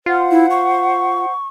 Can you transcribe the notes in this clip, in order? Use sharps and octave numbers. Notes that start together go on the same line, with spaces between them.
F4 C5 F#5
E4
C#6